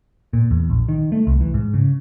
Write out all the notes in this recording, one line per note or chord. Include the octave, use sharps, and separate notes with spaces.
A#2
E2
A#1
D#3
A3
C2
E3
G#2
C#3